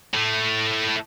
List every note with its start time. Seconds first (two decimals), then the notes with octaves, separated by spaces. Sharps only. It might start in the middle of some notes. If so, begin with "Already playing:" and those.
0.14 A2 A3